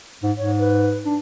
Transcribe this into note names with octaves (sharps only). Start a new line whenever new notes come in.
G#2
G#2 C#5
B4
D4